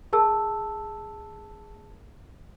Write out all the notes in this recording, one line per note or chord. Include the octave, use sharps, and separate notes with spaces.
G#4 A#4 A5 E6